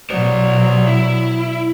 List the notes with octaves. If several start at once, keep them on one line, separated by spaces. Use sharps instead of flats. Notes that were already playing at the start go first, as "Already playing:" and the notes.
B2 F#3 C5 D5
E4